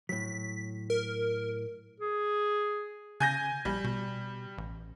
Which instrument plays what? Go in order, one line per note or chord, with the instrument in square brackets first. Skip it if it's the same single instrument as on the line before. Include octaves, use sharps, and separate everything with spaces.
[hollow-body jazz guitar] A2 F#3 [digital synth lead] B6
[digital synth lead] A#4
[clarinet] G#4
[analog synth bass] C#3 [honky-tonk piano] G#5 G6 A#6
[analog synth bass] A#1 [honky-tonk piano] G3
[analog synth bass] B2
A1